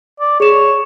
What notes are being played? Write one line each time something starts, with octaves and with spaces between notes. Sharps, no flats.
D5
G#4 C#5 E7